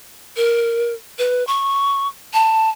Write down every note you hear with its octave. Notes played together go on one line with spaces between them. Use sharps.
A#4
B4
C#6
A5